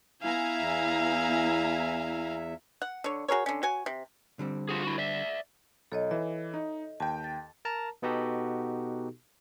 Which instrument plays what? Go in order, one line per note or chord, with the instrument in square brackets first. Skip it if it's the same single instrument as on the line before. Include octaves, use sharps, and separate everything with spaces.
[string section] B3 G#5 A#5 [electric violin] E4 F5
[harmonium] E2 E5
[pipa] F#5
D3 C#5
F#4 G#4 A#4 C#5
D3 C#4
F#4 C#5 G#5
C3
[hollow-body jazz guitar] D3 G3 C4
[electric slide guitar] F4 F#4 G#4
E4 F#4
D5 E5
[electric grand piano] B1 [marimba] A4 C#5 D#5
[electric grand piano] E3 [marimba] E5
[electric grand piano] D#4 [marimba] D#5
[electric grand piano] D#2 G5 [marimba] A5
[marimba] A6
[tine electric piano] A#4 A5 A#5
B2 B3 D#4 F#4 G4 A4